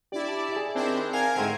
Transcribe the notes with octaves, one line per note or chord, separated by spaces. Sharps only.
D4 E4 G4 D5
A5
G#4 E5
D#3 C4 D4 E4 C5
A#4 F5 G#5 G#6
G#2 D3 A3 C4